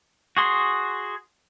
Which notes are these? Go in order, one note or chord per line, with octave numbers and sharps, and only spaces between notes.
F#4 G#4 C6